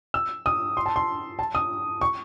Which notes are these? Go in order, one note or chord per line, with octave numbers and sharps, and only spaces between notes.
E6
D#6
C6
A5
C6
A5
D#6
C#6